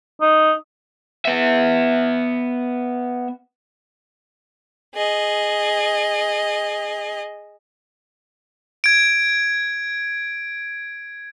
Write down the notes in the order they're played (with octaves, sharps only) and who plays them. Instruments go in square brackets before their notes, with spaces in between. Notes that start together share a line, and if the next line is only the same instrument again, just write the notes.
[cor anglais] D#4
[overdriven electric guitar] B3 E5
[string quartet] G#4 D#5
[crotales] G#6 D7